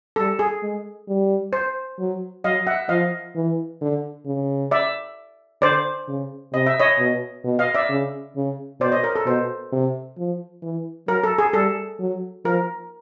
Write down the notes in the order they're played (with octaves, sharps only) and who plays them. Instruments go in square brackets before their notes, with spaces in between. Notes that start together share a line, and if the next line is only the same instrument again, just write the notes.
[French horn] G3 [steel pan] A4
[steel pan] G#4
[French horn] G#3
G3
[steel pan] C5
[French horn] F#3
[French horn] F#3 [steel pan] D#5 F5
[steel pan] E5 F#5
[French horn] F3 [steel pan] D#5 F5
[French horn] E3
D3
C#3
[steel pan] D5 E5
[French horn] D3 [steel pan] C5 D5
[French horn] C#3
[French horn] C3 [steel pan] D#5
[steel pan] E5
C#5 D#5
[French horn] B2
B2
[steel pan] D#5 F5
D5 E5
[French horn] C#3
C#3
[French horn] B2 [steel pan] C5 D5
[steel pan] C#5 D#5
A#4
A4
[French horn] B2 [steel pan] C5
[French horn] C3
F3
E3
[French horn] F#3 [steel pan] A#4
[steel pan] A4
G#4
[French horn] G3 [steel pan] A4
[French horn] F#3
[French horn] F3 [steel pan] A#4